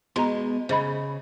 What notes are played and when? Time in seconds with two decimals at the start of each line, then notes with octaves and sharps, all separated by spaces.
0.16 B2 G#3 A#5 C6
0.69 C#3 C5 D#5 B5